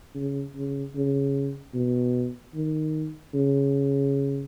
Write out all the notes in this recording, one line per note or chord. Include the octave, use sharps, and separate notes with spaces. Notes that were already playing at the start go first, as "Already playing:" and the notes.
C#3
C#3
C#3
B2
D#3
C#3